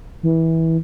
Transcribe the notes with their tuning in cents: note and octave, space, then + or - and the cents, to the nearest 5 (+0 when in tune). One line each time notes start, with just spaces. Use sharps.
E3 -20